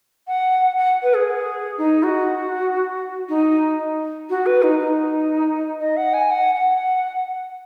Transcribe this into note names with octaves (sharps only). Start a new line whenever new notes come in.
F#5
F#5
B4
G#4
D#4
F#4
D#4
F#4
B4
D#4
D#4
D#5
F#5
G#5
F#5
F#5